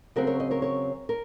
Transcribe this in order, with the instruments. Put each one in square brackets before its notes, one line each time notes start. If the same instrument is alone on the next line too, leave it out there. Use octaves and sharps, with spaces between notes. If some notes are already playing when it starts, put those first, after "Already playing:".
[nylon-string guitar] C#3 F#3 C4 F#4 A#4
A#4 C#5
C5 D#5
A#4 C#5
A#4 C#5
A#4